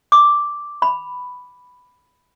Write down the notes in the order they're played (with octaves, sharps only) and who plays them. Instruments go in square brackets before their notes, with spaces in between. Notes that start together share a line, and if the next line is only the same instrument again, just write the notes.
[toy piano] D6
B5